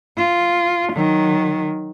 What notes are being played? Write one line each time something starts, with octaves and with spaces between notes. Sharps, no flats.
F4
D#3 F#3